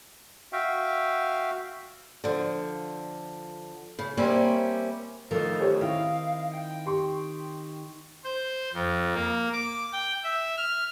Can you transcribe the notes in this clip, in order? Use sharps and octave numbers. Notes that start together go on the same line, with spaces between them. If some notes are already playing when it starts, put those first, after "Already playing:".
F#4 E5 F5 G5
D3 F3
C#3
G3 A#3 C4 C#4 C5 E5
D#3 F3 A3 D#4 A4 A#4
G4 C5 C#5
D#3 C4 E4 F5
G5
G4 C6 C#6
C5
F2
A#3
D6
G5
E5
F6